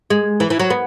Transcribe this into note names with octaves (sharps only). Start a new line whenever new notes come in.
G#3
E3
E3
F#3
B3